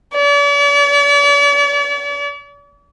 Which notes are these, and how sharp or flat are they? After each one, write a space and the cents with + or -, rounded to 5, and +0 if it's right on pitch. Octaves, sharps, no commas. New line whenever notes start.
D5 -45